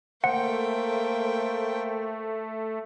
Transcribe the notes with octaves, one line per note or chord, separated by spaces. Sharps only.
A3 A#3 C5 F#5 G5